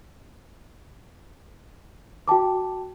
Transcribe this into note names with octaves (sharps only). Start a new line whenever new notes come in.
F#4 G5 A5 D6